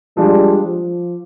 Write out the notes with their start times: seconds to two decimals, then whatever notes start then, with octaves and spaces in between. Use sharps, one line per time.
0.17 F3 G3 G#3 D4
0.65 F3